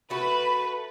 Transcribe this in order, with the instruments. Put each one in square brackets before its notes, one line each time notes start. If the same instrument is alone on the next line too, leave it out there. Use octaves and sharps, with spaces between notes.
[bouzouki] A3 F#4 [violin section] B4 [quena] B5